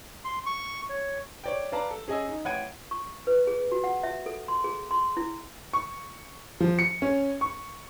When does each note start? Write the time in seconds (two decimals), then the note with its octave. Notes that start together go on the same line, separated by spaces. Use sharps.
0.25 C6
0.46 C#6
0.89 C#5
1.44 C#5 D5 G5
1.72 B4 D5 F5 A5 A#5
1.91 A4
2.08 C#4 G#4 D#5 G#5 E6
2.28 D#4
2.45 A1 F#5 G5 G#6 D#7
2.91 C#6
3.27 B4
3.47 G#4
3.72 F#4
3.84 F#5
4.03 E5
4.26 A4
4.48 C6
4.64 G#4
4.91 C6
5.17 E4
5.73 C#6
6.60 F3
6.79 C#7
7.02 C#4
7.41 C#6